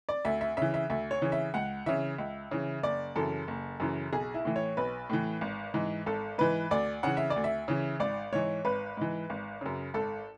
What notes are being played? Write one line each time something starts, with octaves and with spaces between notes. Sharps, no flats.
D5
D2 E5
E5
C#3 E3 E5
E5
D2 E5
C#5
C#3 E3
E5
C#2 F#5
C#3 E3 E5
C#2
C#3 E3
F#1 D5
F#2 C#3 E3 A4
F#1
F#2 C#3 E3
B1 G#4
E4
A2 E3
C#5
B1 B4
A2 E3
G#1
G#2 E3
G#1 A4
G#2 E3 B4
D2 D5
C#3 E3 F#5
E5
D5
D2
E5
C#3 E3
G#1 D5
G#2 E3 C#5
G#1 B4
G#2 E3
G#1
F#2 C#3
G#1 A4